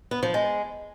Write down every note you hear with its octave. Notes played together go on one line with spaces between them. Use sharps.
B3
F3
G#3